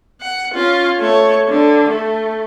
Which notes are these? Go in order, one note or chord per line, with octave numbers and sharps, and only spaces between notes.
F#5
C#4 F4
A3 C#5
D3
A3